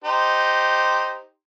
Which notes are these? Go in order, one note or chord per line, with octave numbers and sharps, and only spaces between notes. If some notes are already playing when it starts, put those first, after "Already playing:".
D#4 G4 C5